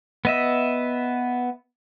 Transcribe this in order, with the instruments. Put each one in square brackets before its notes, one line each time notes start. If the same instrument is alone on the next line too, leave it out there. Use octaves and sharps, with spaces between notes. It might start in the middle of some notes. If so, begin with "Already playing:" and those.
[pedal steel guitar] B3 D#5 E5